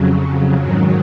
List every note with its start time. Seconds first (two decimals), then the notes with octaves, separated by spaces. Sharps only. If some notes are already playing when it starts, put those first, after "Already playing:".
Already playing: F2 C#3 F#3
0.62 G#2 D#3 F#3